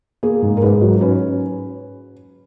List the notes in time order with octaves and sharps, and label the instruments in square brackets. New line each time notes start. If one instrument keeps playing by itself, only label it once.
[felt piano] A#3 G#4
G#2
A#4
G#2 B4
F#3
C#4 B4